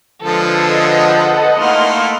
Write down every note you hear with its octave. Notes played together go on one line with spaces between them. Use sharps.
D3 F3 G#3 A4 B4
D#5 F#5
A3 A#3 D#4 E4 C6 F6